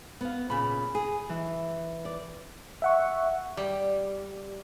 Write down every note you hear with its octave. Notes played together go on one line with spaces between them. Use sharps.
B3 F5
A#2 C#3 B5
G#4
E3
D5
E5 F#5 C#6
G3